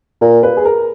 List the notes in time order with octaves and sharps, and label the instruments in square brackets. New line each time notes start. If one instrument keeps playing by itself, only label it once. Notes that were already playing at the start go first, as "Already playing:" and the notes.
[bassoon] A#2 [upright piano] A#4
[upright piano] B4
G#4
A#4